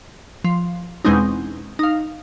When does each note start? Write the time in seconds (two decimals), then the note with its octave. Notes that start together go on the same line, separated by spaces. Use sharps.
0.44 F3
1.05 E2 B2 G#3 C4 C#4 D#4
1.79 D#4 F5